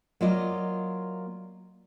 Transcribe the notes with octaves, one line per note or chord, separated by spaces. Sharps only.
F#3 A#3 F4 D5 D#5